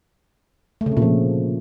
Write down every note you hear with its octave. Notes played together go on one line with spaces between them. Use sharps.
A3
C#3
C3
A#2
F3